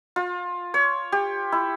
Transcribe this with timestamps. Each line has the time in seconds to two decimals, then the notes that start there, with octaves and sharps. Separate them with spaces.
0.16 F4
0.74 C#5
1.12 G4
1.52 E4